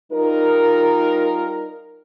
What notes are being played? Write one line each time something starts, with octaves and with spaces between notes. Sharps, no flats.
G3 D#4 F4 A#4